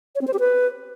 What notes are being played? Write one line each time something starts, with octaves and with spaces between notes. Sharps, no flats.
C#5
C4
C5
G4
B4